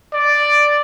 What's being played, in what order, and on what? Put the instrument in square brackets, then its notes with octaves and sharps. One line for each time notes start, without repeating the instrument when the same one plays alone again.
[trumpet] D5